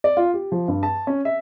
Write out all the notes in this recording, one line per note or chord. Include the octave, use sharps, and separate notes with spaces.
D5
F4
G4
F3
G2
A5
C#4
E5